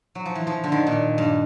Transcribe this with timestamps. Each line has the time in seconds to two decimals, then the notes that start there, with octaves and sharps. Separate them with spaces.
0.15 F#3
0.26 F3
0.35 E3
0.47 F3
0.64 D3
0.72 D#3
0.87 A#2
1.18 G2